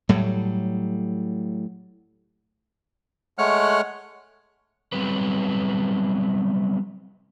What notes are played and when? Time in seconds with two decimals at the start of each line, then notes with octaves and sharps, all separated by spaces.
0.09 A2 F#3 G3
3.38 G#3 A3 C#5 F#5 F6 F#6
4.93 F#3 G3 B3 C4 B4